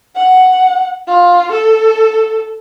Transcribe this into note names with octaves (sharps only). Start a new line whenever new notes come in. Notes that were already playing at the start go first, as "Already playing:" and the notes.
F#5
F4
A4